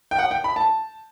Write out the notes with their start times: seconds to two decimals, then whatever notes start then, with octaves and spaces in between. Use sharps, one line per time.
0.11 G5
0.19 F#5
0.31 G5
0.44 B5
0.56 A5